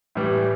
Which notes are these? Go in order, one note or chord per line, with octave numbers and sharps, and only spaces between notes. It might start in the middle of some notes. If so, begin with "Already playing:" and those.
A2 E3 G3